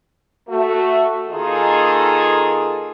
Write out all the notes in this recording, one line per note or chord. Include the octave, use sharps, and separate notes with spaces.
A3 F#4
D#3 A#3 D#4 F4 G#4 A4